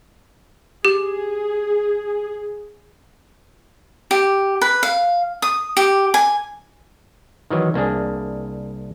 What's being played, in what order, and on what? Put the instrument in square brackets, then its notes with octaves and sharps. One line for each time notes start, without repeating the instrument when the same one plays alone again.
[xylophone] G4 [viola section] G#4
[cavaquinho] G4
B4
F5
D#6
G4
G#5
[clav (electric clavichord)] D#3 E3 F#3
C2 A#3 D4 G#4